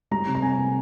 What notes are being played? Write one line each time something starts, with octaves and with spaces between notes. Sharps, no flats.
G3 A#5
C3
A#5
C3 G#5
A#3